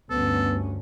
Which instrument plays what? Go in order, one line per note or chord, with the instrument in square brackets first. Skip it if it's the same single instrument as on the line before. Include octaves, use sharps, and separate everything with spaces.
[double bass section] D2 G2 C#4 [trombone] B3 [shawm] A4